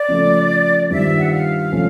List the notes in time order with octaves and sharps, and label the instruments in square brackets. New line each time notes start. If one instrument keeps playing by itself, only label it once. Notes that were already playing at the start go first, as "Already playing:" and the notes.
Already playing: [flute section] D5
[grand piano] C#3 F3 A3
[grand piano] G2 D#3 G3 C4 F4 [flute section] E5
[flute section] F#5
F5
[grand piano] C3 F3 A3 C#4